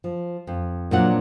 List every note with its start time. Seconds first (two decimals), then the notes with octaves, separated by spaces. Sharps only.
0.04 F3
0.47 F2
0.91 A#2 F3 F#3 D4 F#5